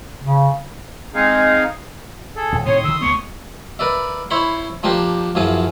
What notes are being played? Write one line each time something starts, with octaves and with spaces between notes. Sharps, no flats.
C#3
G#3 C4 D#4 G#4 F5
G#4 A4
D#1
A2 C3 D#3 C#5 C6 D#6
D3 D#3 E6
C#2 A3 B3 C#6
A#4 B4 D5 E5
E4 C5 C#5 B5 C6
F3 A#3 D4 G4 A#4 C5
F#2 E3 F3 F4 G#4